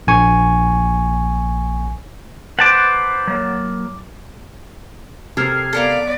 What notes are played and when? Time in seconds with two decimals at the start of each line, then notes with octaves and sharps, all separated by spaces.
0.07 A#1 G#5 C#6
2.59 B4 C5 F#5 A5 D6
3.27 F#3 A#3
5.37 C3 A4 A#4 F6 G#6 C7
5.73 B3 A4 A#4 D5 F5